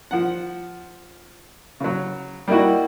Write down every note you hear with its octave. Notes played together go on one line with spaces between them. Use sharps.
F3 F#5
C#3 F#3
G3 A#3 D#4 E4 F#4